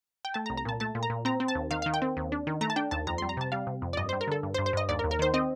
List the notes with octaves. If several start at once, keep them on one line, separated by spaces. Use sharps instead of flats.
G5
A3 A5
A#5
C2
A#5
A#2 A5
A3 A5
A#2
A#5
A#2
C4 A#5
C4
A5
D#2
D#3 F5
F5
D#3
G5
C4
D#2
D4
D#3
A3 A#5
A5
D4 G5
D#2 A5
F2 A#5
C6
G3
A#5
C3 A5
G3 F5
C3
F2
D5
G2 D#5
C5
G3
A#4
D3 A4
G2
C5
G2
C5
G2 D#5
D#2 D5
A#4
D#2
A#4
D#3 C5
C4 D#5